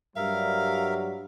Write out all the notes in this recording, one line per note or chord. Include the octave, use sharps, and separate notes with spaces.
G2 F#3 G3 A#4 E5 F5